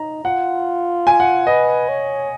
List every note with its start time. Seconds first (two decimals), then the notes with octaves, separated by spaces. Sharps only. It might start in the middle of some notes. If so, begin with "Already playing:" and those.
Already playing: D#4 A#5
0.24 F4 F#5
1.07 G#5
1.20 F#5
1.47 B4 D#5
1.89 C#5